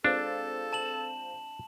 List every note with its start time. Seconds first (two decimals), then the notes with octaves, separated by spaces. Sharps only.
0.04 G#3 C4 D4 F4 A4
0.73 A5 E7 F#7